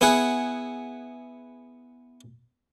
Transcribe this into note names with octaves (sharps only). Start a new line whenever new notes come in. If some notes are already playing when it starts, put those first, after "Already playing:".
B3 E4 G#4 F#5